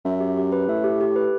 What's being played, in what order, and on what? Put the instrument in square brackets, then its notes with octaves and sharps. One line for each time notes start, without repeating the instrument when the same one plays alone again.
[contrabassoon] F#2 [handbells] E5
[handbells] G4
G4
B4
[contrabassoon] A2 [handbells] E5
[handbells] G4
G4
B4